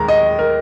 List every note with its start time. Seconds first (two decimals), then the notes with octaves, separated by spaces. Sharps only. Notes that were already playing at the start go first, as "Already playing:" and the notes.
Already playing: D#2 G#3 A#5
0.08 D#5
0.39 A#4